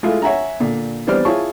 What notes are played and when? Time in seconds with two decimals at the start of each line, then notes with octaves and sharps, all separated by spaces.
0.03 G#3 A3 E4 F4 G#4 A4
0.22 C#5 E5 F#5 G#5 A#5
0.60 A#2 D3
1.07 E3 G3 D4 C5 D5 F6
1.25 E4 F4 G#4 C#5 A5 C#6